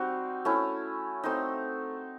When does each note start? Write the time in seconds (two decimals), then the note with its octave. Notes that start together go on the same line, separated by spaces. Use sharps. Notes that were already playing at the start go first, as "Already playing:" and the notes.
Already playing: G3 C4 D#4 F#4
0.45 A3 C#4 E4
1.24 A3 C4 D#4